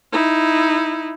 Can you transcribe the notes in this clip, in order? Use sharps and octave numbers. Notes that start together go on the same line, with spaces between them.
D#4 E4